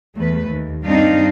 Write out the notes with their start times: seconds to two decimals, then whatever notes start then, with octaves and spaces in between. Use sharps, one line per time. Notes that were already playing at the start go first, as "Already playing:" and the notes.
0.16 E2 A3 B4
0.48 D#2
0.84 G2 C4 D4 D#4 F5